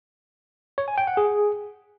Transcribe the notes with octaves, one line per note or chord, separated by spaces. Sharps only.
C#5
G#5
G5
F#5
G#4